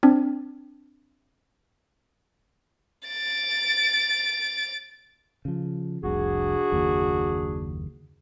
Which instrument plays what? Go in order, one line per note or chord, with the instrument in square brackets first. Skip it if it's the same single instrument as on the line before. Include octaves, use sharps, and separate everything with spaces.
[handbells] C4 D4
[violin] A6 D7
[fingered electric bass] C#3 F3
[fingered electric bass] F1 C2 [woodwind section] D4 F#4 G#4
[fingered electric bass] F#1 D#2 A#3